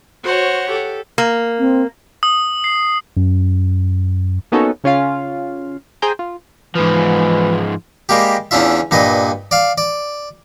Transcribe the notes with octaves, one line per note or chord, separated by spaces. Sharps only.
F#4 C5 C#5 F#5
G4 A4
A#3
C4
D#6
C7
F#2
A#3 B3 C#4 D#4 F#4 A4
C#3 C#4 F4 F5
G#4 C5 G5 G#5 A#5 G6
F4
G#2 E3 F3
G3 G#3 A#3 G4
E2 C#4 D4 F4 E5
G2 A#2 B4 D#5
D5 F5
D5